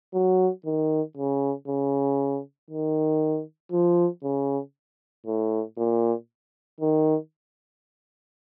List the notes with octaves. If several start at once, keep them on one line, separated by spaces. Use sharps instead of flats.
F#3
D#3
C#3
C#3
D#3
F3
C#3
A2
A#2
D#3